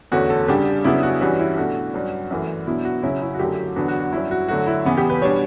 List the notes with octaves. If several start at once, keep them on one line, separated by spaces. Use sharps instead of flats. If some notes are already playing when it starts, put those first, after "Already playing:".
E2 D3 A3 C#4 F#4
A4
C#3 G3 D4 G4
C#3 F#3 B3 D4 E4
F#4
G2 E3 G3 C#4 F#4
E4
B2 A3 D4 F#4
G2 F#3 C#4
F#2 E3 A3
B2 F#3 B3 D4 E4
F#4
C#3 F#3 C#4 E4
E4
F#4
F#2 D3 F#3 A3 G4
E2 D3 F#3 B3 D4 F#4
F#4
F#4
G2 F#3 C#4 E4
F#4
D3 F#3 A3 F#4
E4
C#3 E3 B3
G4
B4
B2 G3 D4 C#5